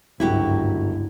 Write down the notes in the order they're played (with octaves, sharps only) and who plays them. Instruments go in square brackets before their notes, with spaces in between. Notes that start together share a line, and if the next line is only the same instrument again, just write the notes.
[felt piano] G1 F#3 [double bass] C#2 G#2 [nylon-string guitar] E4 F#4 G4